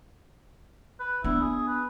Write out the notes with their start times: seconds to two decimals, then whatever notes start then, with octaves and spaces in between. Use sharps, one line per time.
1.00 B4
1.24 B3 D4 E4
1.41 G#4
1.68 B4